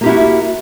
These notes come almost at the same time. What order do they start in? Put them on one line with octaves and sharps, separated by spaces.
A#3 G4 E4 F#4